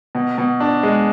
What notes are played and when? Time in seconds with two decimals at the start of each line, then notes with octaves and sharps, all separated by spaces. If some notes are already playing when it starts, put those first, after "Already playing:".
0.15 B2
0.38 B2
0.60 D4
0.83 G#3